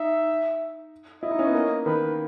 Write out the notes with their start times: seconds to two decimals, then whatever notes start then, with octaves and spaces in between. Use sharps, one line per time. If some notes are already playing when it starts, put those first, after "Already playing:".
Already playing: D#4 E5
1.23 E4 D#5
1.31 D#4
1.39 C#4
1.47 B3
1.55 A#3
1.86 D#3 B4